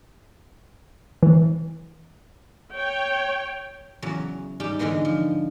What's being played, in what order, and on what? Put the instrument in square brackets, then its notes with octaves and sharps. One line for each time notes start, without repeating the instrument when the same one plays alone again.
[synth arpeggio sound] E3
[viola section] C#5 G5
[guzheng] E2 C#3 F#3 A#5
G#2 G3 G4 G5
G#2 D3 E3 B3 D#4
F3